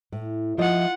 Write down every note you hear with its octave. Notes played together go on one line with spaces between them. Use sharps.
A2
F3 E4 F4 D#5 F#5